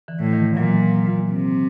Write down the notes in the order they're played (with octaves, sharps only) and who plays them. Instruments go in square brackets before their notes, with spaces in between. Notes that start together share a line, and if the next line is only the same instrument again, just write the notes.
[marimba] D3 E3
[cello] A2
[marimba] D#3 F3
[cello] A#2 [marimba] E3 F#3
[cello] C3